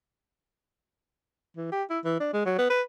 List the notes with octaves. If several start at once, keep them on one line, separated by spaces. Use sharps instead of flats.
E3
G4
E4
E3
D4
G#3
F#3
B3
B4